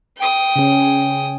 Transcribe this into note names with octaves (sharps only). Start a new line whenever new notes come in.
G5 D#6
C#3 C#4